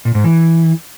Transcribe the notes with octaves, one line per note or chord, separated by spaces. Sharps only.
A#2
G#2
E3